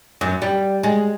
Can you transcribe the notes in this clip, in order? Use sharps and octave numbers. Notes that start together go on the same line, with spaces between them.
F#2
G3
G#3